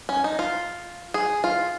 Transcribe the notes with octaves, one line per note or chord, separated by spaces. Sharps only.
C#4
D#4
F4
G#4
F4